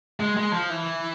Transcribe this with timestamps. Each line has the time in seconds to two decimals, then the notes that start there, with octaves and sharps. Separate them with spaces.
0.20 G#3
0.37 G#3
0.53 F3
0.70 E3